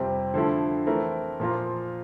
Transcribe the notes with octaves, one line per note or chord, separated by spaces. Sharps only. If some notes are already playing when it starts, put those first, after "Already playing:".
Already playing: F2 C3 G3 C4
D3 F3 A3 E4
E3 A3 C4 E4 A#4
A#2 F3 A#3 F4 A#4